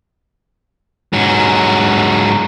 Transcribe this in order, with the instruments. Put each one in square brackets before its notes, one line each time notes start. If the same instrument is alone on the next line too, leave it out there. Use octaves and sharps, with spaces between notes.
[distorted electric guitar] G#2 F#3